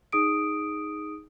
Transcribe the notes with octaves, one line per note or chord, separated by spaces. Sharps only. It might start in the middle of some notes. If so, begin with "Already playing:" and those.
D#4 G#4 D#6 D7